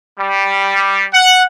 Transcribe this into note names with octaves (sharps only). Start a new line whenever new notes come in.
G3
F#5